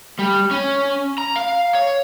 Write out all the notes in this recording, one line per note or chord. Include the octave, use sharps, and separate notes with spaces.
G3
C#4
A#5
F5
C#5